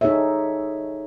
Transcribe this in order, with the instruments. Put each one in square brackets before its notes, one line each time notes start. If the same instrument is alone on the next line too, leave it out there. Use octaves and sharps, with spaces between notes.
[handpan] D#4 G#4 A4 C#5 E5